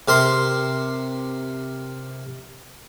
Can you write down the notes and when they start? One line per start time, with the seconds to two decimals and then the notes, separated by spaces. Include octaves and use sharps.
0.08 C3 A#4 C6